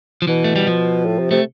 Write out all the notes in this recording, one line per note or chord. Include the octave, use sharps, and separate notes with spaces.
F3
B2 E3
A3
G3
F3
A2
C3
C3 A3